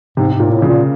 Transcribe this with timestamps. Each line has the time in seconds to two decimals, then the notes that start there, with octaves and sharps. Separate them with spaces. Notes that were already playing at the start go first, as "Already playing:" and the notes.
0.17 G#2 C3
0.33 G#2
0.40 A#2
0.51 A2
0.62 C#3
0.67 A#2